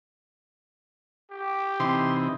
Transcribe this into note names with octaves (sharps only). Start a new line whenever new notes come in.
G4
C3 E3 D#4 C6